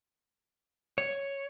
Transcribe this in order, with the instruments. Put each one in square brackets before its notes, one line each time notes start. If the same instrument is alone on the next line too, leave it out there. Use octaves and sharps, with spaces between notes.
[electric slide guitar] C#5